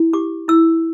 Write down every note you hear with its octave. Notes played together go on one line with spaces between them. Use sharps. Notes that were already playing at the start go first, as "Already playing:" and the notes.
Already playing: E4
G4 D6
E4 E6